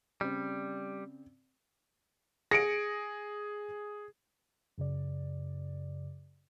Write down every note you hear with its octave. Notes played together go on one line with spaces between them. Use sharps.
C#3 G3 C4 D5
G#4 A#6 C#7 D7
F#2 C#3 D5